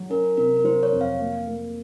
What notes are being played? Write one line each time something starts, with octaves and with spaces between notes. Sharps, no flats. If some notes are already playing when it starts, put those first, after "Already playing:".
Already playing: F#3
C#4 A#4
C3 A#4
A#4
F#3 C5
C#5
F2
F5
A#3
A#3